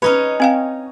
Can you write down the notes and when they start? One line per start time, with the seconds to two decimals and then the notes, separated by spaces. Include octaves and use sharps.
0.02 C#4 D#4 B4 C#5
0.40 C4 F5 G5